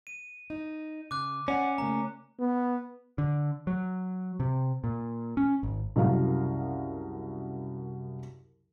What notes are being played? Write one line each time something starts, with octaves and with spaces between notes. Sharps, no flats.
D#7
D#4
C#3 D6 F#6
C#4 D5 F#5
C#3 A3 A#3 A#5
B3
D3
F#3
C3
A#2
C#4
G#1
C2 F#2 C#3 F#3 F5